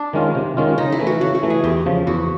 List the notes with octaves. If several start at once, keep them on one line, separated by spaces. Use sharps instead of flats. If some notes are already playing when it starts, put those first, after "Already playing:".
Already playing: D4
D#3 G#3 C#4 F4
C3
D#3 G#3 C#4 F4
C#3 D#4
E4
E3 A3
F#4
C#3 F#4
F#4
E3 A3
G#4
E2 G4
C#3 F3
E2 F#4